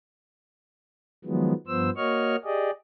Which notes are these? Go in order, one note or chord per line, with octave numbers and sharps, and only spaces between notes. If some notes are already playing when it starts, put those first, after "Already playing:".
D#3 F3 F#3 G#3 B3
G2 F3 B3 C5 E6
A#3 F#4 C#5 D#5 C#6 F6
G4 G#4 D5 D#5